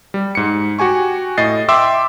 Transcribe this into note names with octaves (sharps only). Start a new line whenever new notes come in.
G3
G#2 C#7
F#4 G4 G#5 C#6
A2 D#5 A6 C7
E5 G5 C6 D6 E6